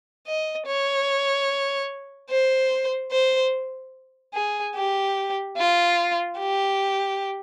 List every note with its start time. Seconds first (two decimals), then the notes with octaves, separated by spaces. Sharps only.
0.27 D#5
0.67 C#5
2.30 C5
3.12 C5
4.34 G#4
4.76 G4
5.57 F4
6.39 G4